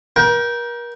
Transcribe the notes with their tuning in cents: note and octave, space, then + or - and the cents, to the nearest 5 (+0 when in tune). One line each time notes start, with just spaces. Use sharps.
A#4 +35 G5 -10